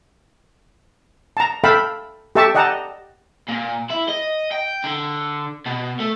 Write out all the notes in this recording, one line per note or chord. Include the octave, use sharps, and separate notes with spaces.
A5 A#5
A4 E5 F5 G5 A5 B5
G4 A4 E5 A5 C#6
D5 D#5 F#5 G5 A5 A#5
A#2
E4
D#5
G5
D3
B2
A3